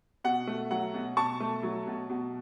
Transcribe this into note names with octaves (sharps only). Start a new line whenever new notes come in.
B2 F#5
A3
F#3 F#5
B2
B2 A5 C#6
A3
F#3
B2
B2